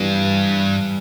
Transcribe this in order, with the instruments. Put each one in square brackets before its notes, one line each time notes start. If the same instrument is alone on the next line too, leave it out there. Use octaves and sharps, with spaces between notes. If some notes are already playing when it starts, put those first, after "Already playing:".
Already playing: [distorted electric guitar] G2 [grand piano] E3 G3 B3